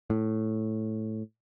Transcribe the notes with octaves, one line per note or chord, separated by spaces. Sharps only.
A2